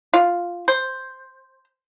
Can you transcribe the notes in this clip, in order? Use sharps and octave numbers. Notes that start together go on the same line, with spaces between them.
F4
C5